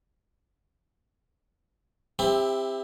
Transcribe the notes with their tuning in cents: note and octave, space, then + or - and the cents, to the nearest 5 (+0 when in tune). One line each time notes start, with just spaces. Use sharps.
C4 +0 E4 +0 G4 +30